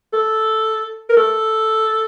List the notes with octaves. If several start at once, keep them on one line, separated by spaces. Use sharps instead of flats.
A4
A#4
A4